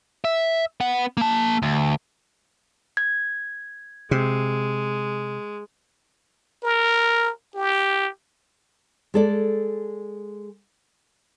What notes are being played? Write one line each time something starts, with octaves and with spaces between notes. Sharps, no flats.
E5
B3 F#5
A#3 A5
D2
G#6
C3 G#3
A#4
G4
G#3 A4 D5